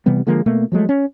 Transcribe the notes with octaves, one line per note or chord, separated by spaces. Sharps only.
C3 E3 G3 B3
D3 F3 G#3 A#3
B2 A3 A#3
F3 F#3 G#3 A3
C#4